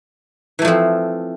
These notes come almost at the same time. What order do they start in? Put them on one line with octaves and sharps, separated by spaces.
E3 A3 F3 C4